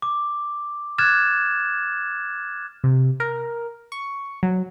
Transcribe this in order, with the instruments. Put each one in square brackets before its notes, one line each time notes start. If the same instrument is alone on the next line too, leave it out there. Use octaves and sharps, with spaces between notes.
[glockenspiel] D6
D6 F6 F#6 G#6 A6 E7
[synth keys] C3
A#4
C#6
F#3